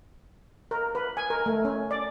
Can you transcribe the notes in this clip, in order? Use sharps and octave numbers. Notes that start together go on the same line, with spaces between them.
A#4
B4
G#5
A#4
A3
C#4
D5